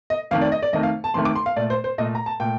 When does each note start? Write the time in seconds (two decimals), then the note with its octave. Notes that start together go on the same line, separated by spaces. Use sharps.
0.10 D#5
0.31 F2 D#3 A3 F5
0.41 D5
0.52 D#5
0.62 D5
0.73 F2 D#3 A3 D#5
0.83 F5
1.04 A5
1.14 F2 D#3 A3 C6
1.25 D6
1.35 C6
1.46 F5
1.56 A#2 A3 D5
1.70 C5
1.84 C5
1.98 A#2 A3 D#5
2.15 A#5
2.26 A5
2.40 A#2 A3 G5